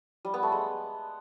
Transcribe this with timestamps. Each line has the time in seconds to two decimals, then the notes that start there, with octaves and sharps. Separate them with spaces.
0.25 G3
0.34 B3
0.43 A3
0.52 G#3